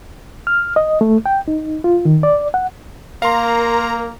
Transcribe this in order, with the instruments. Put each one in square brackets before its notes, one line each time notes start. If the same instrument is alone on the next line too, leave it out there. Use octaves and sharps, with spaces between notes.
[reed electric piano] F6
D#5
A3
G5
D#4
F4
D#3
D5
F#5
[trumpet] A#3 [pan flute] A#4 [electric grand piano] F5 C6 [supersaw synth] A#5